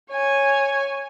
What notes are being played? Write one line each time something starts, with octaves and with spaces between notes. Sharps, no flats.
C#5 G#5